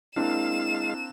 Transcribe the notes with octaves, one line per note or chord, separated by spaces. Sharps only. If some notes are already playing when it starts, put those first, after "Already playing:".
G#3 A#3 C4 D4 E4 F5 E7